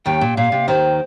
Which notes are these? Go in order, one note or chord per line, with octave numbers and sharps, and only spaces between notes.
D#2 D#3 G5
A#2
A#2 F5
C3
D#2 D#3 C5